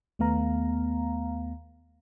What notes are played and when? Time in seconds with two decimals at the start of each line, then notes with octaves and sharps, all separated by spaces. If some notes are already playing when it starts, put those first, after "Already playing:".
0.19 D#2 A3 B3 F5 A#5